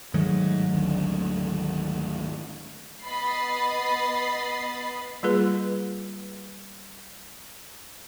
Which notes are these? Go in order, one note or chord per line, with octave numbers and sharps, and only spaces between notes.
G#2 D#3 F#3 A3
G#1 D2 D3
B3 D#5 B5 A6 C7
G3 A#3 F4 G#4 B4